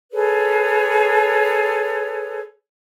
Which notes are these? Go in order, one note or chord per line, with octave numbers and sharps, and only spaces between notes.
G#4 A4 B4 C#5